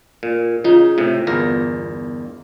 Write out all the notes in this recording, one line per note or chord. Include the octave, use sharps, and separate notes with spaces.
A#2
C#3 D#4 F4
A2 C3
G1 E2 A#4